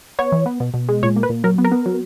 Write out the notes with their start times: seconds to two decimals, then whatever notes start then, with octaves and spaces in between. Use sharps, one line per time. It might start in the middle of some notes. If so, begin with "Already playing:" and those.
0.19 B3 C#5
0.32 E3
0.46 B3
0.60 B2
0.74 B2
0.89 G#3
1.03 A#2 C#5
1.16 A#3
1.23 B4
1.30 A#2
1.44 F#3 A#4
1.58 B3
1.65 A#4
1.72 B3
1.86 F#3